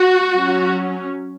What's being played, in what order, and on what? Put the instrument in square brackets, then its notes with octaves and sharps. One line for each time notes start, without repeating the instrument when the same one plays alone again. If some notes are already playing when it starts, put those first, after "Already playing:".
Already playing: [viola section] F#4
F#3 C#4